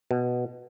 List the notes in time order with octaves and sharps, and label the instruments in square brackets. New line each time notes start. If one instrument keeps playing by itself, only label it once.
[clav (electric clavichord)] B2